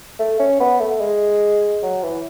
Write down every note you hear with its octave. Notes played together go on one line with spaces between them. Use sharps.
A3
C#4
B3
A3
G#3
F#3
E3